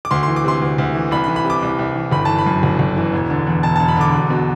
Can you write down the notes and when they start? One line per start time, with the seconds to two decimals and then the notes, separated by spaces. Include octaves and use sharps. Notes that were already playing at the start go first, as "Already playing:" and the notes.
0.05 D6
0.11 D2 C6
0.23 C6
0.27 E3
0.36 D6
0.44 C3 C6
0.62 D2
0.78 D2
0.95 E3
1.11 C2 B5
1.24 B5
1.28 E3
1.36 B5
1.45 C3
1.50 D6
1.62 C2
1.79 C2
1.95 E3
2.12 G1 B5
2.25 E3 A5
2.38 B5
2.46 F#2
2.63 G1
2.79 G1
2.97 E3
3.13 E1
3.30 D3
3.47 E2
3.63 E1 A5
3.76 A5
3.80 E1
3.88 B5
3.96 D3 D6
4.14 E1
4.30 B2